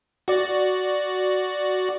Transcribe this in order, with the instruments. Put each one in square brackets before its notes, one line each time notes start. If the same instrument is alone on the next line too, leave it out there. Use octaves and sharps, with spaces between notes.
[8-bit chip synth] F#4 D5